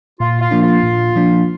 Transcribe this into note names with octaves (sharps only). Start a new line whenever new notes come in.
A#2 F4
F4
F3 A#3 D4
F4
A#2
F3 A#3 D4